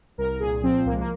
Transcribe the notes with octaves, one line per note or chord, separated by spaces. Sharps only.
C2 A#4
A#2 G#4
F3 C4
C2 A#3
G#3
A#3